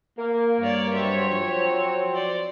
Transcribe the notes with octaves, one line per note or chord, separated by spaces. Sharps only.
A#3 A#4
G2 C#5 D5
F#3 C4 C#5 E5
F3 C#5
C5 D5